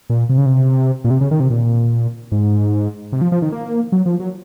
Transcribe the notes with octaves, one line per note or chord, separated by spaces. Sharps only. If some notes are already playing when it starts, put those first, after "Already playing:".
A#2
C3
C#3
C3
A#2
C3
C#3
D#3
C3
A#2
G#2
C3
F3
F3
D#3
A#3
F#3
F3
F#3